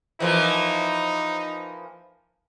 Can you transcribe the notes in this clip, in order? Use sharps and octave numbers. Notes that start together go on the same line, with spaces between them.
E3 F3 A#3 D#4